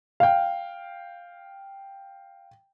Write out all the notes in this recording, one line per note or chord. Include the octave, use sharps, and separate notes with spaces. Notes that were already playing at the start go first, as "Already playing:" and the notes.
F5 G5